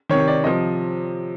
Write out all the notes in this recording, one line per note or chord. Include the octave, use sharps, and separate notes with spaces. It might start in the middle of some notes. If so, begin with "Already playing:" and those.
C3 D#3 C#5
D5
C3 F3 D#5